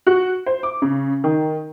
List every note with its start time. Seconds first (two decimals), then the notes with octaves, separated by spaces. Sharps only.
0.07 F#4
0.46 C5
0.63 D6
0.82 C#3
1.24 D#3